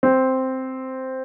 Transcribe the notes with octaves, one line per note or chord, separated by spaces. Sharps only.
C4